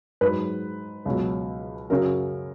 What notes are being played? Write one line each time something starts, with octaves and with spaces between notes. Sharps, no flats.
G#2 F#3 B4
C#2 B2 F#3
F#2 C#3 F#3 A#4